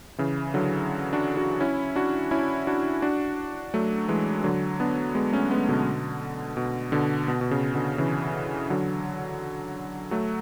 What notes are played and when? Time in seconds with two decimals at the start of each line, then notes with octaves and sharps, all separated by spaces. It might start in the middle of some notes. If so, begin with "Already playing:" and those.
0.18 C#3 E3
0.54 D3 F#3
1.13 D4 F#4
1.37 D4 F#4
1.60 C#4 E4
1.96 D4 F#4
2.31 C#4 E4
2.67 D4 F#4
3.02 D4 F#4
3.74 F#3 A3
4.08 E3 G#3
4.44 D3 F#3
4.80 B3 D4
5.15 G#3 B3
5.33 A3 C#4
5.51 G#3 B3
5.68 B2 D3
6.57 B2
6.92 B2 D3
7.28 B2
7.41 B2
7.51 C#3
7.75 B2 D3
7.98 C#3 E3
8.70 D3 F#3
10.11 F#3 A3